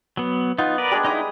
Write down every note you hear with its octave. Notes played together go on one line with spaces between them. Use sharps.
F#3 B3
B3 D#4 F4
A#4 B4 D5
G3 G#3 D4
D#4 E4 A#5 B5 D#6